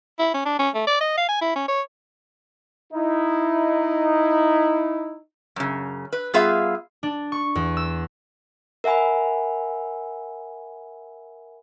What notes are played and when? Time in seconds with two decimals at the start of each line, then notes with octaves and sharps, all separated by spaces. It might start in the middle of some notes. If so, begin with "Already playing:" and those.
0.19 E4
0.34 C#4
0.46 D4
0.59 C#4
0.75 A3
0.87 D5
1.01 D#5
1.18 F5
1.29 G#5
1.41 E4
1.56 C#4
1.68 C#5
2.93 D#4 E4
5.56 F#2 C#3
6.13 B4
6.34 G3 B3 F4 G#4 E5 F5
7.03 D4
7.32 C#6
7.55 E2
7.77 E6
8.84 A#4 E5 F#5 G#5 B5